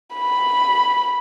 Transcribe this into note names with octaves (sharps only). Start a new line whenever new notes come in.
B5